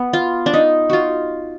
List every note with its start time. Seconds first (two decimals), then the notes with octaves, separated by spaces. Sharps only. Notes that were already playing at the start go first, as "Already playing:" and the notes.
Already playing: B3
0.13 F4
0.46 D4
0.54 D#4
0.90 F4 F#4